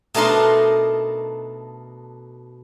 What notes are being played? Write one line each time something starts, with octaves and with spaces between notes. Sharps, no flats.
B2 A3 D4 D#4 A#4 C6